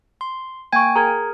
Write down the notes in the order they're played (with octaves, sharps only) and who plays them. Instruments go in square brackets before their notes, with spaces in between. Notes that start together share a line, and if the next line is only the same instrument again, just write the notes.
[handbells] C6
[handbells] A#3 G5 G#5 [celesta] C#6 G#6
[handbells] G#4 A#4 [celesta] A#5 G#6